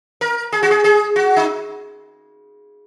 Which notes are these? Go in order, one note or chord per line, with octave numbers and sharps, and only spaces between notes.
A#4
G#4
F#4
G#4
G#4
F#4
D#4